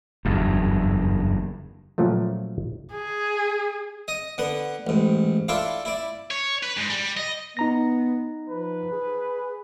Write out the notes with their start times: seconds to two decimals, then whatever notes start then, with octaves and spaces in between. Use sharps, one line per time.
0.25 F#1 E2 G2
1.98 A#2 C#3 F3 F#3 A3
2.92 G#4
4.08 D#5 D#6
4.38 D3 B3 F#5
4.87 A1 G#2
5.49 D4 E4 F4 A4 D5 F5
5.85 E4 D5
6.31 C#5
6.63 B4
6.77 G#2
6.90 G3
7.17 D#5
7.57 B3 D#4 A#5 A#6
8.49 F3 B4
8.92 G#4